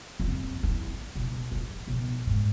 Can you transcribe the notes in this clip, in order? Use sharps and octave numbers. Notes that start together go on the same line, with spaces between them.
F2
E4
B2
F3
B1
G#2